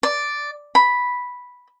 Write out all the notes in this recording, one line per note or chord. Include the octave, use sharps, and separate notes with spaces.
D5
B5